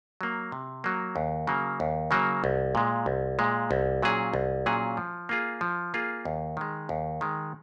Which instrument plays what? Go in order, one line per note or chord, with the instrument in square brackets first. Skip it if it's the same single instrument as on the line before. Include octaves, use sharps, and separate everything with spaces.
[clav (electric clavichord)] F#3 A#3
C3
F#3 A#3
D#2
C#3 F#3 A#3
D#2
C#3 F#3 A#3
C2
A#2 G#3
C2
A#2 G#3
C2
A#2 F#3 C#4 G#4
C2
A#2 F#3 C#4 G#4
F3
A#3 F4 G#4
F3
A#3 F4 G#4
D#2
D#3 G#3
D#2
D#3 G#3